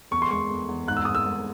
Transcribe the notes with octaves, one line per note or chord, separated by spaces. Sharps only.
E2 C#6
C6
G#3 C#6
E2
E2
G#2 F#6
E6
G#2 D#6
E6
G#2